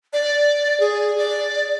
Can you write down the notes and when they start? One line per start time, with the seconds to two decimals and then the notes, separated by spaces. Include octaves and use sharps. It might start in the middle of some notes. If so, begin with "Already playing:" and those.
0.13 D5
0.80 G#4
1.18 D5